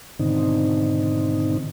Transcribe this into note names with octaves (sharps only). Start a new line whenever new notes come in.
G#2 B2 D3 D#3 C4 D#4